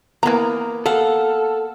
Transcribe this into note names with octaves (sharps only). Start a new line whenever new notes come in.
E3 A#3 B3 A#5
A4 F5 F#5